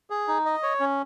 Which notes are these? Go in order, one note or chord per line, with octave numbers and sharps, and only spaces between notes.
G#4
D#4
D#5
C#5
C#4